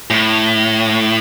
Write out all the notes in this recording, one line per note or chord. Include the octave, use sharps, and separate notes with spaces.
A2